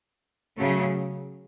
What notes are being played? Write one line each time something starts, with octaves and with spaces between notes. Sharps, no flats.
C#3 F#3 A3